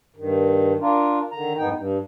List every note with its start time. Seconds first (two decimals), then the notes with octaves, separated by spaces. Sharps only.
0.16 G2 D#3
0.80 D4 F4 A#4
1.31 D3 D#3 A#5
1.58 F2 G#2 B3 D#4 G5
1.75 G2